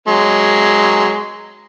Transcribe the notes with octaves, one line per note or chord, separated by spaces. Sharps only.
F#3 G#3